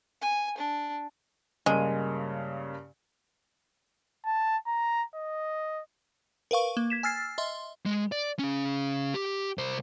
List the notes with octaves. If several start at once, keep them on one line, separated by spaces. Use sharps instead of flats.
G#5
D4
G2 C#3 G#3 A#3
A5
A#5
D#5
A#4 B4 F5 C#6
A#3
G#6 B6 E7
G#5 E6 F6 A6 C7
D#5 E5 C6
G#3
D5
C#3 C#4
G4
C2 C5